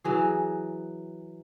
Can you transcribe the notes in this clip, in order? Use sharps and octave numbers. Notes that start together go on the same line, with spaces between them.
E3 F#3 G#4